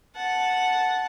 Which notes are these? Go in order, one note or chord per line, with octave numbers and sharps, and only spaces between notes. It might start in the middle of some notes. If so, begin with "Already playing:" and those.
F#5 A5